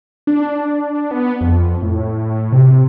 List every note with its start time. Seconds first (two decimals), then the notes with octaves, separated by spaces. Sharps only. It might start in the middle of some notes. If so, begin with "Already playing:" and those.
0.27 D4
1.11 B3
1.41 F2
1.82 A2
2.52 C3